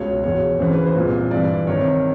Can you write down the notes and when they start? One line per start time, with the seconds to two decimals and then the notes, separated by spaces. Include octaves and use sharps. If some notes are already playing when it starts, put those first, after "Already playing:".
Already playing: C#2 B2 C#5
0.24 E2 B2 C#5
0.59 E2 C#3 E3 C5
0.72 B4
0.86 C5
0.96 C2 A#2
1.31 G2 E3 D5
1.67 C2 C3 D#3 C#5